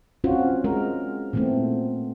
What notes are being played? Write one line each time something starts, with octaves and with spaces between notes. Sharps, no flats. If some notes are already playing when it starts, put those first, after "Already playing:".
C4 C#4 F4 F#4 C5
G#3 A#4
A#2 E3 A3 B3 C4